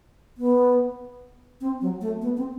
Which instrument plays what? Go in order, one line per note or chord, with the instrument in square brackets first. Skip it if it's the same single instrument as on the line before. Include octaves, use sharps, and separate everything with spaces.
[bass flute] B3
C4
F#3
A3
B3
C4